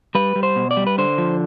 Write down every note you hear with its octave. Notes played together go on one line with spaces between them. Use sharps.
G3 B4
G3
C5
B2
D5
G3
B4
D3 C5
F3